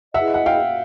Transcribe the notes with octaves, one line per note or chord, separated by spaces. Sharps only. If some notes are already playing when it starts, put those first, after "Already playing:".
E4 G#4 B4 D#5 E5 F#5
F#5
F5 G5